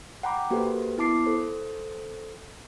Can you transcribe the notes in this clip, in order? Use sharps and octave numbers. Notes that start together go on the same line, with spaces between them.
F#5 G5 A#5 B5 D6
A#3 F#4 G4 A4 B4 C5
B3 E4 A5 D6 C7
A4 C5